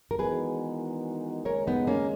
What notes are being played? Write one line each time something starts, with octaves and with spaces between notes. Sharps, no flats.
A#4
E2 D#3 G#3 D#4 F#4 G#4 B4
D#2 C#3 G#3 A#4 C#5
B3 D#4
A#3 C#4